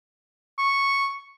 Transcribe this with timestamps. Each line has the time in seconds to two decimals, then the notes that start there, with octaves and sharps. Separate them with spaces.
0.58 C#6